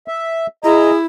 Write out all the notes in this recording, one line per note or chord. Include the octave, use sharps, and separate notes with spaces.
E5
E4 G#4 D#5 A#5